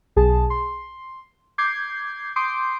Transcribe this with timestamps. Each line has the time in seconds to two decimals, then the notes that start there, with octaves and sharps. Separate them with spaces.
0.16 B1 G#4 A5
0.50 C6
1.58 D6 G6 G#6 C7
2.36 C6 D6 D#6 G6 C7 D7